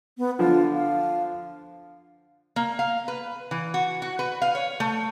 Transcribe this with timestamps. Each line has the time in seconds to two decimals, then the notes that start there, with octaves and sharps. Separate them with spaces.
0.18 B3
0.39 D3 F3 F4
0.73 F5
2.56 A#3
2.79 F5
3.08 B4
3.51 E3
3.74 F#4
4.02 F#4
4.19 B4
4.42 F5
4.55 C#5
4.80 A3